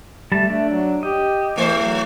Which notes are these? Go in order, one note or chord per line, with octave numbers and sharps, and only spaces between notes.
G3 A3 A5
A3 D4
F#3
G4 D#5
E2 A3 C5
F#3